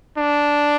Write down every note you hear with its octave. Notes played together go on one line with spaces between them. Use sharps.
D4